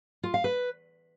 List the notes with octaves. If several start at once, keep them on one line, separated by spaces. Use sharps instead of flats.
F4
F5
B4